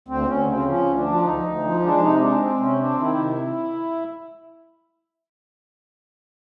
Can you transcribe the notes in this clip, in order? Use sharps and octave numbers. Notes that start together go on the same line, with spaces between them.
D2 C4
D2 C#4
C#3 C4
F3 C#4
D2
D4
F3
D2 D#4
D2
F3
G#3 D4
C3 D#4
G#3 D4
C4
C3 C#4
C4 D4
D#3 E4
C3